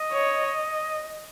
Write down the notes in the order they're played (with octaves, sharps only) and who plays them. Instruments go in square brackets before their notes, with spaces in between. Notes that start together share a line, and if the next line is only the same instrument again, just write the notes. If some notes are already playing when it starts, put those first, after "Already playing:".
Already playing: [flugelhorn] D#5
[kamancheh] C#5